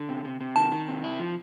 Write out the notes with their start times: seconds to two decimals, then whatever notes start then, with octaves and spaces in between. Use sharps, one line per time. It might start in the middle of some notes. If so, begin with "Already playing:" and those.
Already playing: D3
0.09 C3
0.25 C3
0.41 C3
0.56 D#3 A5
0.72 D#3
0.88 C3
1.04 E4
1.19 F3